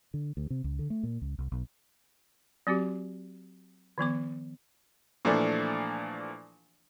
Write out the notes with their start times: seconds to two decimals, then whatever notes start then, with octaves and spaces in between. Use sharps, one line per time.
0.14 D3
0.37 D2
0.50 C3
0.64 C#2
0.79 D3
0.90 A3
1.03 A#2
1.22 C#2
1.38 C2
1.52 B1
2.67 F#3 C4 F#4 G4
3.98 D#3 F3 B3 D6
5.25 A#2 E3 F3 A3 D4